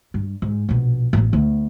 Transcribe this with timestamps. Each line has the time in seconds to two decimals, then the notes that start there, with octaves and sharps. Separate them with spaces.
0.14 G2
0.42 G#2
0.69 A#1 B2
1.13 A1 B3
1.33 D2 B3